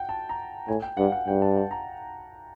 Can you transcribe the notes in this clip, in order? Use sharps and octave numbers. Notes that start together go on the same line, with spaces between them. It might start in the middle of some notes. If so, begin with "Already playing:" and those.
Already playing: F#5 G5
A5
A#5
A2 G#5
G5
G2 F#5
F5
F#5
G2 G5
A5
A5
A#5